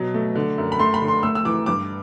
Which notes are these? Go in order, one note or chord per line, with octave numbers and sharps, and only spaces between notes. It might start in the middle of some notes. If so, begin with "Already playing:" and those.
Already playing: B2 F#3
A3
D3
F#2
B5
A3 C6
B5
D3
C6
A3 E6
E6
E3 D6
G2 D6